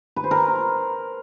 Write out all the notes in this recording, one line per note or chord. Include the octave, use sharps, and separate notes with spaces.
B4
C5
A#4